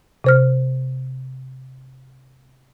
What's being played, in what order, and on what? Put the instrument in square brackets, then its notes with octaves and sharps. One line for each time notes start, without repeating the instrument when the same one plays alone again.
[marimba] C3 C5 F6